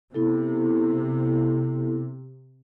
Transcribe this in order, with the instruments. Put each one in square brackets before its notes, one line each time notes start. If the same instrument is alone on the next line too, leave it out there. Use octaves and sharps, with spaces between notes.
[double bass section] C3 [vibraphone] B3 E4 A4